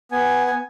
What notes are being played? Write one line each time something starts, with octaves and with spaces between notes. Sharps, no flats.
B3 G#5
G#5